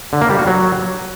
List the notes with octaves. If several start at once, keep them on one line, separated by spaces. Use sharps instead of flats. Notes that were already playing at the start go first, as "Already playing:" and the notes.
D3
A#3
G3
F#4
F#3